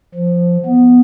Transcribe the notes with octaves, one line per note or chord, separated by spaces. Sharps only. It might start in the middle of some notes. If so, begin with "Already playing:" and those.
F3
B3